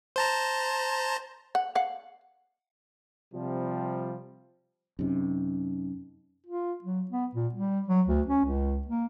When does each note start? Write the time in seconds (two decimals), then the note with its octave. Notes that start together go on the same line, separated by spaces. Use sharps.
0.16 C5 A5 A#5
1.55 F#5
1.75 F5 F#5
3.34 C3 F3 G3
4.99 F#2 C3 C#4 D#4
6.46 F4
6.84 F#3
7.11 B3
7.35 A#2
7.54 G3
7.88 F#3
8.07 D2
8.27 C#4
8.45 C#2
8.87 A#3